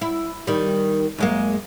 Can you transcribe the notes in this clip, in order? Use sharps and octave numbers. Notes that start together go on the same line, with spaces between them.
E4
D#3 G3
F#2 G#3 A#3